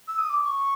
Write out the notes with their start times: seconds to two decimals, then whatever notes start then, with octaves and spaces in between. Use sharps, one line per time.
0.07 E6
0.18 D#6
0.29 D6
0.40 D6
0.44 C#6